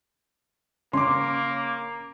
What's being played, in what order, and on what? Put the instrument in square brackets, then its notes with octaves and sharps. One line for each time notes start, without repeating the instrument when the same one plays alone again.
[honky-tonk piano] C#3 C#4 [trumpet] A#3 [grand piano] C6 D6